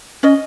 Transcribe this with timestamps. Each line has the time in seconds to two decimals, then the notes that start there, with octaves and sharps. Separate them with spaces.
0.23 C#4 D#5